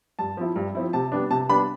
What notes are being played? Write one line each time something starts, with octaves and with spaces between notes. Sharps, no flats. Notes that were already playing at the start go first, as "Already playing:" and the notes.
G2 A5
F3 C4 E4
G2
F3 C4 E4
C3 A5
G3 B3 D4
C3 A5
G3 B3 D4 B5